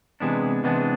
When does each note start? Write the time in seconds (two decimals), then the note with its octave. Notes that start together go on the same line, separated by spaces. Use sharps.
0.20 C3 E3 G#3 B3 D4
0.64 C3 E3 G#3 B3 D4